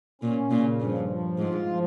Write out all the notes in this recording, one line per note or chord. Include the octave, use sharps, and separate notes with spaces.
A#2 C#4
A#2 C#3
G2 F3
F3
G#2 F4
F3